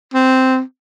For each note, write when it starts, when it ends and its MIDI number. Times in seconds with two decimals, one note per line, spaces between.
0.14 0.60 60